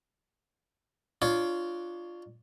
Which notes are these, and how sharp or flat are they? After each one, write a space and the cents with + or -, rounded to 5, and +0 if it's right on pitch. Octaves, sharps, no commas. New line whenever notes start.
D4 +25 F4 +0 C#5 +15